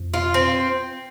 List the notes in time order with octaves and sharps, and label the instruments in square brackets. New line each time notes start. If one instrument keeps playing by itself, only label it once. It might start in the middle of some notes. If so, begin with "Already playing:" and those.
Already playing: [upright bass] F2
[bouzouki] F4
C4